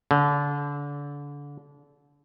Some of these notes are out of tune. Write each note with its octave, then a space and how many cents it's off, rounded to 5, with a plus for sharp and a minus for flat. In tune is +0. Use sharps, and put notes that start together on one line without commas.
D3 -30